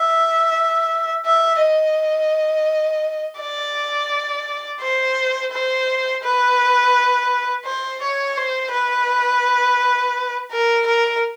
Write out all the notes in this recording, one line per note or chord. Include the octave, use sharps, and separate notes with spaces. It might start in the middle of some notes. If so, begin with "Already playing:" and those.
Already playing: E5
E5
D#5
D5
C5
C5
B4
C5
C#5
C5
B4
A#4
A#4